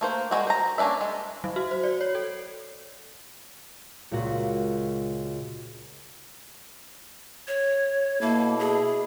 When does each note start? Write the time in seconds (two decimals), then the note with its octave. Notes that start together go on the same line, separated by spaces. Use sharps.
0.01 A3 A#3 C5
0.31 G3 G#3 C4 F#4
0.47 C5 A#5
0.78 A#3 C#4 D4 D5 E5
1.01 G#3
1.44 F#3
1.56 F#4
1.71 C5
1.83 D5
2.01 C#5
2.15 A4
4.11 C#2 A#2 F#4
7.48 C#5
8.21 B2 A#3 E4 A4
8.59 G#4